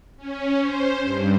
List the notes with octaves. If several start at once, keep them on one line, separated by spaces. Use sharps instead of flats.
C#4
C5
G2